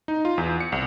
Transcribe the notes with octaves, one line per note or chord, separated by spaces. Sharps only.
D#4
F4
E2
C#7
C2